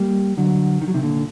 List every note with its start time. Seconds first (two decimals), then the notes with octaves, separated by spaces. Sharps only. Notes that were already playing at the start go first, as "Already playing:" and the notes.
Already playing: G3 A#3
0.37 D3 F#3
0.81 D#3
0.88 F#3
0.94 C3 D#3
1.02 A#2 D3